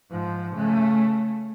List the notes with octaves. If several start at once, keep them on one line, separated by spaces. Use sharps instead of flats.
G#2 F3
C#3 A3